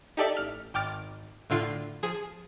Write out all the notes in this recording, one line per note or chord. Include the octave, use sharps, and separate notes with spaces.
D#4 G4 A4 D5 E5
A1 F6
G#1 G5 D6 F6 A6 D7
A2 D3 F4
F3 G#4